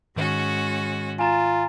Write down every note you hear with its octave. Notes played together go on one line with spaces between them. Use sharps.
G#2 D#3 G#3 C#4 F#4
F4 G#5 A#5 A6